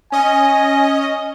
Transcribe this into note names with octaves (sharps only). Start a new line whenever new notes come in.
C#4 D#5 G#5